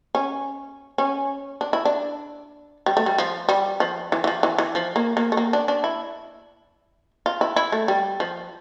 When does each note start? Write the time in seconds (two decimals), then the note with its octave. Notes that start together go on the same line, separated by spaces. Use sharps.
0.15 C#4
0.98 C#4
1.61 D4
1.73 E4
1.85 D4
2.86 G3
2.97 A3
3.06 G3
3.18 F3
3.49 G3
3.80 F3
4.12 E3
4.24 E3
4.27 F3
4.43 E3
4.58 E3
4.75 F3
4.96 A#3
5.17 A#3
5.32 A3
5.37 A#3
5.53 D4
5.68 D4
5.84 E4
7.26 F4
7.41 E4
7.56 E4
7.72 A3
7.88 G3
8.20 F3